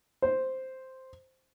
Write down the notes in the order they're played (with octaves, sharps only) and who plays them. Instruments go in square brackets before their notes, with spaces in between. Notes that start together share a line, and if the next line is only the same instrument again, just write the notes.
[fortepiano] C5